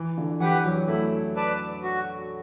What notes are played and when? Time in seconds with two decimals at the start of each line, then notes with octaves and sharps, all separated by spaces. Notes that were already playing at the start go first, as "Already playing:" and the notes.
Already playing: E3
0.18 D3
0.40 E3 G4 B4 F#5
0.64 F#3
0.88 A3 E4
1.36 B4 D5 A5
1.83 F#4